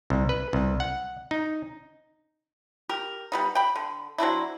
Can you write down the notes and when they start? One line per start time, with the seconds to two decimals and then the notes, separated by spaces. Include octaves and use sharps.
0.10 C2
0.29 B4
0.53 C2
0.80 F#5
1.31 D#4
2.89 G4 A#4
3.32 G3 B3 D#4
3.55 G5 B5
3.76 D3
4.18 F#3 C4 D4 E4